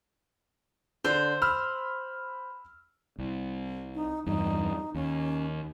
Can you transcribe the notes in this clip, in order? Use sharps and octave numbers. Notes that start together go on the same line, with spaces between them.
D3 C5
B5 E6 F6
C2
D#4
E2 G2 D#4
D#2 C#4